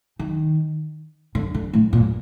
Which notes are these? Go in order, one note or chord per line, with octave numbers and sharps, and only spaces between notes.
D#3
D3
D3
A2
A#2